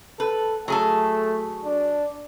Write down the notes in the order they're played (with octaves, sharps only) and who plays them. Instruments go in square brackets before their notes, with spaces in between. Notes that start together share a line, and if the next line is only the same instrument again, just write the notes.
[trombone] A4 [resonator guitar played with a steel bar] B4
[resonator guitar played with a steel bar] F#3 G#4 A4 [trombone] A3
[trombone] D4